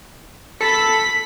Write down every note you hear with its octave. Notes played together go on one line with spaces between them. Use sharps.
A4 B5 B6